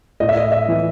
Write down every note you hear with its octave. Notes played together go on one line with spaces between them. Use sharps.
A2 D#5
E5
D#5
E5
E3